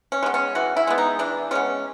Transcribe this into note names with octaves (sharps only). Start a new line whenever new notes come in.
C#4
G#3 B3
C#4
E3 F#4
E4
G#3 B3
D#4
E3 D4
G#3 B3 C#4